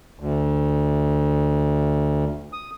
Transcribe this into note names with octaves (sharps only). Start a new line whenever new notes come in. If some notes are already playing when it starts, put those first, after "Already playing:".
D2
D#6